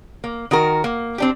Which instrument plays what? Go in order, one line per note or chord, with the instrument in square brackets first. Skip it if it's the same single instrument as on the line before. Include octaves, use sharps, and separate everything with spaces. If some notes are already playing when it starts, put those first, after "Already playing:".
[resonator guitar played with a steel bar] A#3
D#3 F#4 A#4
A#3
C4 D4 G4